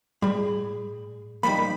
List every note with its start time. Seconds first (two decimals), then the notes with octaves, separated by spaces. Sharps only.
0.22 A2 G3 G#4 B5
1.43 F3 G3 A#3 D#4 B5